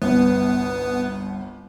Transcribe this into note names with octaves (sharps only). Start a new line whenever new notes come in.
G1 C2 B3